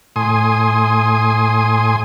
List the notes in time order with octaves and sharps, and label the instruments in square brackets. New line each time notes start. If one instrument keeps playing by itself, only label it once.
[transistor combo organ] A2 G#5 C6 D#6